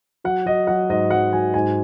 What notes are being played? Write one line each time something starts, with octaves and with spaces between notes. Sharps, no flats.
F#3 F#5
F#3 D#5
F#3 F#5
G#2 D#5
F#3 F#5
F#3 G#5
G#2 G#5